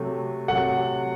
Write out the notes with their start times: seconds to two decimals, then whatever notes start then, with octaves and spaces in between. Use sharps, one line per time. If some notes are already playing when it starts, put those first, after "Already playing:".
Already playing: C3 F#3 A3
0.48 C3 F#3 A3 F#5